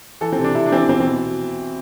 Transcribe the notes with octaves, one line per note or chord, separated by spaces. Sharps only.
E3 A4
C4
C3
D4
C3 E4
D4
E3 C4
D4
B2 C4
C4
B2